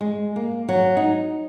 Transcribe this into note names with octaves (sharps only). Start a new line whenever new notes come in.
G#3
A#3
F#3
D#4